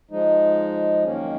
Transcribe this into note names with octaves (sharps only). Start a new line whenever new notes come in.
F3 G#3 D#4
F#2 D#3 A#3 C#4